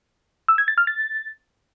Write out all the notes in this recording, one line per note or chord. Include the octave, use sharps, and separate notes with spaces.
E6
G#6
A6
F6
A6